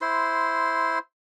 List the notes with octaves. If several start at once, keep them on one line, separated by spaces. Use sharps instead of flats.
E4 C5 C6